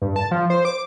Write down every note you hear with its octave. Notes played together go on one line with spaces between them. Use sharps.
G2
A5
F3
C5
D6